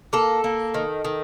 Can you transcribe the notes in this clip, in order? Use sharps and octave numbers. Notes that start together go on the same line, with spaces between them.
A#3 A4
A#3
D#3
D#3